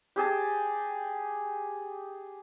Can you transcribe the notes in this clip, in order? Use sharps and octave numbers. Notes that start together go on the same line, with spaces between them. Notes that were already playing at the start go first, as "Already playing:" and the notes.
G4 G#4 A5